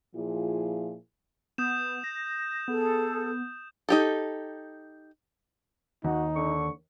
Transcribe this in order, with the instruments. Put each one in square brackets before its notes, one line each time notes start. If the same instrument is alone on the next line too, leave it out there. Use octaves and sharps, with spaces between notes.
[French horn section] A#2 F3 E4 G#4
[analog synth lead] B3 [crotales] D#6 G6 E7
[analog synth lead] A#6
[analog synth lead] B3 [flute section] G#4 A4
[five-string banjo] D#4 G4 A4
[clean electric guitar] D#2 [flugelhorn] D#4 [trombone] F#4
[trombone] D3 [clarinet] C#6